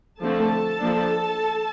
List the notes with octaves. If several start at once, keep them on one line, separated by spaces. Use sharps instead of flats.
D3 F3 A3 C4 A4 A5
F3 A#3 D4